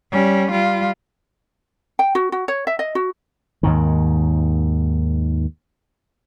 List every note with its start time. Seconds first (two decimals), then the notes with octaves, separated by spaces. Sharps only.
0.12 G3 C#4
0.51 G3 F4
1.99 G5
2.15 F#4
2.32 F#4
2.48 C#5
2.67 E5
2.79 D#5
2.95 F#4
3.63 D#2 G#2 D#3